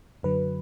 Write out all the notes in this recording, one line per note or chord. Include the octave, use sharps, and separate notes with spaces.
F#2 D3 F#3 B4